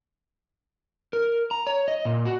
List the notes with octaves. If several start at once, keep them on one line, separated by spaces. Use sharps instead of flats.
A#4
A#5
C#5
D#5
A#2
F#4